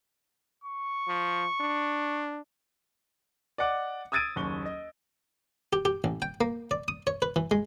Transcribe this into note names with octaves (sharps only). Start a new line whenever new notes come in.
C#6
F3
D4
D5 D#5 F#5 D6
D#6 E6 G#6 A6 D7 D#7
F#1 D#2 C#6 G7
D#5
G4
G4
A1
G5
A#3
D5
D#6
C#5
B4
E3
G#3